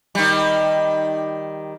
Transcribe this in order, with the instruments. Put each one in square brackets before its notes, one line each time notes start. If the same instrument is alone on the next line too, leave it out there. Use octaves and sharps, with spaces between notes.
[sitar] D#3 G3